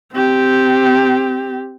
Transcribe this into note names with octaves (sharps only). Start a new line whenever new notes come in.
C4 G4